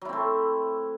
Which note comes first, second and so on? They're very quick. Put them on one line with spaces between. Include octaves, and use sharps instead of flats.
F#3 E4 C4 A3